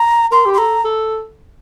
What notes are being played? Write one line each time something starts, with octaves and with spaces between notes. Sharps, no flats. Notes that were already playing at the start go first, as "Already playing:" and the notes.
Already playing: A#5
A#4 C6
G4
C6
A4 A#5
A4